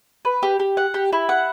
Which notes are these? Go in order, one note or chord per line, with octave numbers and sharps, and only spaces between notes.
B4
G4
G4
F#5
G4
E4
F#5